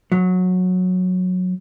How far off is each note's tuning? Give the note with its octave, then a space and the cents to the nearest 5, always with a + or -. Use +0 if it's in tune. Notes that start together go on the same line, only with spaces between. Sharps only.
F#3 -15